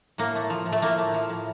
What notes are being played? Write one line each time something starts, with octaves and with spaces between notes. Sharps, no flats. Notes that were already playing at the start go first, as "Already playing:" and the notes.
A2 A#3
A3
F3
A2
A3
A2 A#3
A3
F3
A2